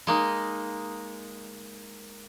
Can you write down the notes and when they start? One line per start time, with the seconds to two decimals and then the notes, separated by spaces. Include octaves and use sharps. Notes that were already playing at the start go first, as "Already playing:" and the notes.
0.07 G#3 A#3 D#4